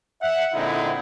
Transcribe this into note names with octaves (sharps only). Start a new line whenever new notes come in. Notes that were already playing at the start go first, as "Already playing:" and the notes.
E5 F#5
A#2 D3 G#3 C4 D#4 E4